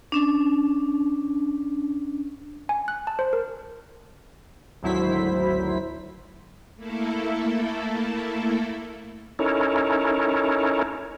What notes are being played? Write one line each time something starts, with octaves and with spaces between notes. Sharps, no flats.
C#4 D4
G#5
F#6
A5
C5
A#4
G#1 D2 F#3 E4 C5 B6
A3 A#3 E4 A4
C#4 D#4 E4 A4 A#4 C#5